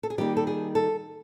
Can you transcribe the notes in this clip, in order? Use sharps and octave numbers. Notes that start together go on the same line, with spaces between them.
A4
G#4
D#3 G3 A#3 D#4 G4
A4
G#4
A4